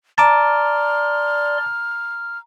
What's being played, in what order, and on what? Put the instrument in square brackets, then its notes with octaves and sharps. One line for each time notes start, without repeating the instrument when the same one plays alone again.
[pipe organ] D5 C6 [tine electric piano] A5 D6 [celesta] A#5 [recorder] F6